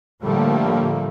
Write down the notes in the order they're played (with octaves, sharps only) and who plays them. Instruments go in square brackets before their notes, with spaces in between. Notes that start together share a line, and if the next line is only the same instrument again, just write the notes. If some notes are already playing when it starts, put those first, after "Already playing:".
[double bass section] A2 D3 F3 G3 A3 A#3